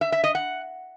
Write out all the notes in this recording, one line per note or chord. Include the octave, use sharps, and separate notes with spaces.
E5
E5
D#5
F#5